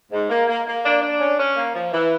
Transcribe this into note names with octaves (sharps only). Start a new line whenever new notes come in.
G#2
A#3
A#3
A#3
D4
D4
C#4
C#4
A#3
F3
E3